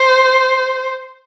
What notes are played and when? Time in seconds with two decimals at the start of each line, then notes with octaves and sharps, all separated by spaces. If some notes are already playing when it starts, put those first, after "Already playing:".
Already playing: C5